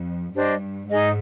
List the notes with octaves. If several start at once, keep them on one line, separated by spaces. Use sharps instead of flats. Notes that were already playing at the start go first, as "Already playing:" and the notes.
Already playing: F2
G2 D4 G4 C5 D#5
G#2 D#4 G#4 D#5